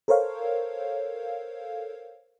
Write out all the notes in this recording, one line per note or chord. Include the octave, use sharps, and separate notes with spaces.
A4 A#4 C5 C#5 F5